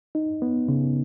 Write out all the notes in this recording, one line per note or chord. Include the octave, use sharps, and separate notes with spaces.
D#4
B3
C#3